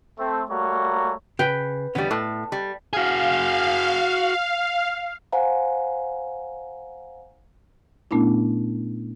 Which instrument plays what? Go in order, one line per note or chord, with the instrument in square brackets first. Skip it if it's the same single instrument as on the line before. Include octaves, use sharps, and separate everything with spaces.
[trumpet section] A3 C4
G3 A3 A#3 F#4 C#5 A#5
[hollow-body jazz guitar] C#3 [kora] B4 G5
[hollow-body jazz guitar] E2 D3 C#4 [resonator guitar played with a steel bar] G3 B3
[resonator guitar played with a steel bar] A2 [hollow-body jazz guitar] A4
[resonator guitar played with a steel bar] G3
[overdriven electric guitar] F#4 G#4 [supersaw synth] F5
[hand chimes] C5 F5 F#5 G#5 A#5
[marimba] A#2 A3 B3 C#4 D4 E4